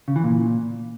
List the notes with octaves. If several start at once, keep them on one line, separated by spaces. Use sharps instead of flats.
C#3
E3
A#2